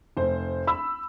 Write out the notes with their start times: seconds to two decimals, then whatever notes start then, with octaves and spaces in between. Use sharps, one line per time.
0.17 F1 C5
0.67 B5 E6